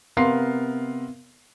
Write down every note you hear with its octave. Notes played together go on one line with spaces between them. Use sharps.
C3 B3 A#4 F5 C6 C7